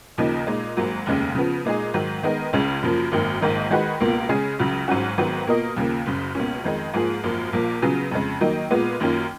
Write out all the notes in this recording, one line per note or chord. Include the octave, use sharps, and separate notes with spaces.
D#2 C#3 F3 A#3 D#4
A#2 G#3 D#4
G#1 G#2 F#3 A#3
F1 D#2 C#3 G#3 C#4
C#3 F3 B3
A#2 G#3 D#4 G#4
G#2 D#3 F#3
D#3 G#3 B3 D#4 A#4
C#2 C#3 G#3 C#4
F#2 C#3 F3 A#3
G#1 F#2 D#3 A#3
A#1 G#2 D#3 A#3 D#4
D#3 G#3 D#4 F#4 B4
C#2 B2 A#3 F4
C#3 G#3 C#4 G#4
C#2 C#3 F#3
G#1 G#2 F#3 C#4 F#4
G#1 G#2 D#3 F#3 B3
B2 A#3 F4 A#4 D#5
D#2 C#3 F3 A#3
F#1 F#2 C#3
C#2 B2 A#3 C#4
F2 D#3 G#3 D#4
G#2 F3 A#3 F4 G#4
G#1 F#2 F3 A#3 F4
A#1 A#2 F3 A#3
C#3 F#3 B3 F4 G#4
F2 C#3 G#3
D#3 F#3 A#3 D#4
A#2 G#3 B3 F4
F#2 D#3 A#3 C#4 F4